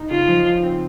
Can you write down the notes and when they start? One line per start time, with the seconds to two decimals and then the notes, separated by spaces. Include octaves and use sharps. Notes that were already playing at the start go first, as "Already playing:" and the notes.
Already playing: D#4
0.11 C#3 F4
0.28 F3
0.46 F3
0.63 C4